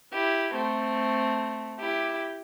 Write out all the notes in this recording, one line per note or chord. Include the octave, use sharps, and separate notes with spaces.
E4 G4
A3 C4
E4 G4